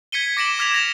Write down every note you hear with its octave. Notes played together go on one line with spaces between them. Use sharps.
G#6 B6 C#7 D#7 G7
D6 A#6 D7 E7 F#7
D6 F6 G#6 B6 F7
A#6 F7